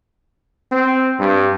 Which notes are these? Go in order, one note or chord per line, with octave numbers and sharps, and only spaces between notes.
C4
G2